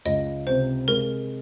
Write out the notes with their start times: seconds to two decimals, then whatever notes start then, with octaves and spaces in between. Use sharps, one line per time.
0.05 C#2 D#5
0.47 C3 C5
0.88 G#3 A#4